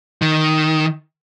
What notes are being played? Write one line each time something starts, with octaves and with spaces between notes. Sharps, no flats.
D#3